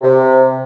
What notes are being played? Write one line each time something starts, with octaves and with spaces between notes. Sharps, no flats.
C3